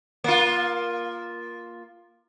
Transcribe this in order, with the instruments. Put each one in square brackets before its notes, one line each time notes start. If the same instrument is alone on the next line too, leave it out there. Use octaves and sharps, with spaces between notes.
[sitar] A#3 F4